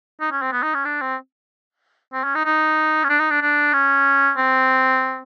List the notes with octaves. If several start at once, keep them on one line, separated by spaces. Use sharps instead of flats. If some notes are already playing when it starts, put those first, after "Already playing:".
D#4
C#4
C4
B3
D#4
C#4
D4
C4
C4
C#4
D#4
D#4
C#4
D4
D#4
D4
D4
C#4
C4